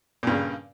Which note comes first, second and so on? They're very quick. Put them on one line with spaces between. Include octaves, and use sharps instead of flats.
A#2 G2 C#3